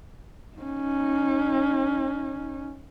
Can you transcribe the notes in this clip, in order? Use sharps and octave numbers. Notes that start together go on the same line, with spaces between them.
C#4 D#4